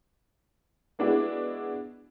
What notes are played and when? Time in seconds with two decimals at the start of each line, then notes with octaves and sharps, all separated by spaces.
0.99 G#3 B3 D4 E4 F#4 G#4